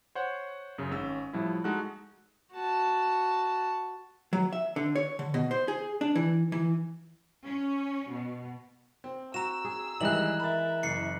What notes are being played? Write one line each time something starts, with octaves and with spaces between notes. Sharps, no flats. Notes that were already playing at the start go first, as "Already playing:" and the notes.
C5 C#5 F#5
F#2 C#3
G#1 C#4 E6
A2 F3 G3 E4
G#3 D#4 F#4 A4 F#6
F#4 A5
F#3
E5
D3
C#5
D3
B2
C5
G#4
D4
E3
E3
C#4
B2
C4
F#4 A#5 E6 E7
G#4
G#1 E3 G3 G#3 G#4 F#6 F#7
A#4 E5 B5 A6
F#1 C7 C#7